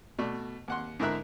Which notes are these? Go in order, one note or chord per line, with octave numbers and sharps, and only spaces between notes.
B2 A3 D5
D#2 F#5 C6
G#2 D3 E4 A#4 E5 F#6